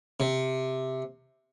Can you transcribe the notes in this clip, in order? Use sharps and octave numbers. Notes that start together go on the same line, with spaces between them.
C3